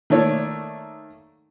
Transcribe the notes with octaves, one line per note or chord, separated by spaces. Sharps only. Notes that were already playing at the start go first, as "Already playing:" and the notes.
D#3 A3 A#3 C#5 D5